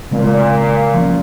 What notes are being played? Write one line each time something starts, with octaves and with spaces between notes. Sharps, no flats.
A#2 C#3 G#3 C4
F3 A#3 C#4